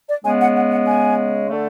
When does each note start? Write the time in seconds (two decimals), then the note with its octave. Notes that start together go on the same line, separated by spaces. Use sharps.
0.09 D5
0.23 C#3 G#3 B3 G#5
0.40 F#5
0.55 F#5
0.71 F#5
0.86 G#5
1.48 D3 A3